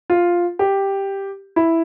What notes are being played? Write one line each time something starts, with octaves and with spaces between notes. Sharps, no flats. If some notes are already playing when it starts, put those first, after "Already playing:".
F4
G4
E4